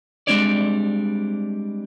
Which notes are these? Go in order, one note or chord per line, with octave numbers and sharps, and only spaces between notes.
G3 G#3 C4 D4 C#5 D5